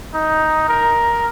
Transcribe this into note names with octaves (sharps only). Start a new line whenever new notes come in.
D#4
A#4